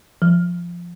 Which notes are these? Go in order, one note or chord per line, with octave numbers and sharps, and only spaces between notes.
F3